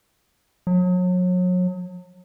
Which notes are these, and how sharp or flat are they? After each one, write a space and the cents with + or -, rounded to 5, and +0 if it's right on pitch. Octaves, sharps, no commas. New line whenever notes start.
F#3 -35